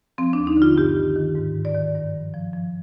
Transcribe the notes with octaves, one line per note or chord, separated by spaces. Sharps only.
F3 C4
D#2 D4
D#4
D3 F4
G2 G4
D#3
D#3
G#2
D#3
D5
D#3
G2
F3
F3
F3